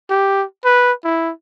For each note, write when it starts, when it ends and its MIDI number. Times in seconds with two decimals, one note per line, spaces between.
0.10 0.44 67
0.65 0.92 71
1.05 1.31 64